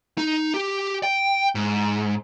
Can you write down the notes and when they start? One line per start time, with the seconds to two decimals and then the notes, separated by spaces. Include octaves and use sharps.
0.18 D#4
0.54 G4
1.03 G5
1.55 G#2